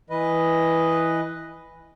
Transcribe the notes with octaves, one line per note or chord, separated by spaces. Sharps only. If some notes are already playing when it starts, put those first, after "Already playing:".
E3 B4 D#5